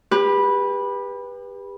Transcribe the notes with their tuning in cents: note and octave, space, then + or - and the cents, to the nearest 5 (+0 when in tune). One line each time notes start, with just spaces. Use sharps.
G4 +30 B4 -10